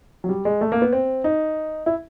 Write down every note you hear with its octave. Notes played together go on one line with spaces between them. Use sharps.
F#3
G3
G#3
A3
A#3
B3
C4
D#4
E4